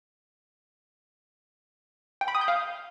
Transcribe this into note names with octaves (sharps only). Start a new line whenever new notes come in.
G5
B5
D#6
G6
F5